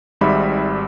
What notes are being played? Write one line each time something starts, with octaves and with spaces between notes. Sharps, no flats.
G#1 G#2 G3 E5 B5